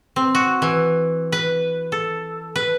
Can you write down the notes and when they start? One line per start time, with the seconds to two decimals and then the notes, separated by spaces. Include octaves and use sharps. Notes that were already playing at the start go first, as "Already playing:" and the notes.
0.16 C4
0.35 F#4
0.62 E3
1.32 B4
1.92 A4
2.56 B4